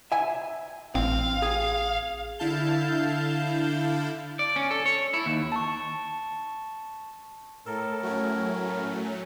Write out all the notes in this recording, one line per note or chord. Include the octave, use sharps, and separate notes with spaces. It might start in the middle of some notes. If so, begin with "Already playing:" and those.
E5 G#5
A1 C4 F5
G#4
D3 E4 F5 A5 G6
D5
C#4
A4
C#5
E4
D#2
A5 C#6
A2 A4 A#4
F#3 A3 C#4